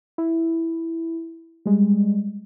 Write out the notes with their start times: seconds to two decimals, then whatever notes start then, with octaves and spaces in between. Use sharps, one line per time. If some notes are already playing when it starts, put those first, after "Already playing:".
0.18 E4
1.66 G3 G#3